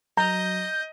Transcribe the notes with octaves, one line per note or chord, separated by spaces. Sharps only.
F#3 D#5 A#5 G6